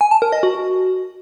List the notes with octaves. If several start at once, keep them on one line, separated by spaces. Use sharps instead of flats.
G#5
A5
A#4
D#5
F#4